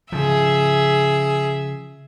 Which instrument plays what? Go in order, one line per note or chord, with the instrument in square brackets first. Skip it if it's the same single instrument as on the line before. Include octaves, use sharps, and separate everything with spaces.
[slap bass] C#3 F3 [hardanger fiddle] G#4 E5